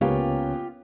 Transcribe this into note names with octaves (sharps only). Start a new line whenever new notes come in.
C#2 C#3 A#3 B3 C#4 F4 G4 C#5